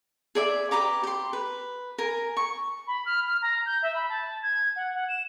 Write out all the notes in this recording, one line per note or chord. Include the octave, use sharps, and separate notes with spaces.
G#4 D5 E5
G4 B4 A#5 D6
G4 C6
B4
A#4 G#5
C#6
B5
F6
F6
A#5
G6
E5
B5
A5
G#6
F#5
F#5
E7